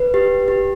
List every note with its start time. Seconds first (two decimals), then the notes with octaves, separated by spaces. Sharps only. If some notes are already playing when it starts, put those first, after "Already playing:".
Already playing: B4
0.14 G4
0.48 G4